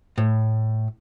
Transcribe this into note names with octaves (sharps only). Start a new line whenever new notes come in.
A2